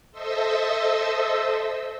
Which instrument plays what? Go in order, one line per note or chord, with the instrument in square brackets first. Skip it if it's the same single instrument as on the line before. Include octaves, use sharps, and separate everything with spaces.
[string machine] A4 C5 D#5 E5 E6